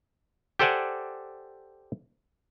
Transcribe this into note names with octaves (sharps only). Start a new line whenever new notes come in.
G4 A4 C5 D5 F#5 G#5